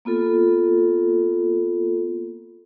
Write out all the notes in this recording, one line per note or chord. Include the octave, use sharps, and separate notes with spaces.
A#3 B3 F4 A4